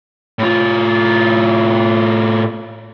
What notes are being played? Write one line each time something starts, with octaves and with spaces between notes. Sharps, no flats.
A2 F4